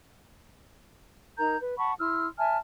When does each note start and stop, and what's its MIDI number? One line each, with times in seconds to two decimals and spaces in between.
1.38 1.56 63
1.38 1.56 70
1.38 1.56 82
1.38 1.56 91
1.59 1.73 71
1.77 1.93 78
1.77 1.93 81
1.77 1.93 83
1.77 1.93 85
1.99 2.26 64
1.99 2.26 84
1.99 2.26 88
1.99 2.26 89
2.38 2.57 76
2.38 2.57 80
2.38 2.57 81
2.38 2.57 89